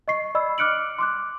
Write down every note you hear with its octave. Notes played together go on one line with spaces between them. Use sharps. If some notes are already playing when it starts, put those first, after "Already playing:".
D#5 C#6 C7
D5 D#5 B5 E6
D6 F6 F#6 C#7 D7 F#7
C6 D6 F#6